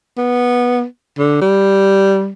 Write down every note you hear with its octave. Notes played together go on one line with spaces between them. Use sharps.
B3
D3
G3